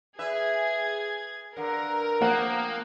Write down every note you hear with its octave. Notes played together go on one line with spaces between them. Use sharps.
G#4 B4 E5 G#6
G2 D3 A#4
F3 A#3 C4 F#5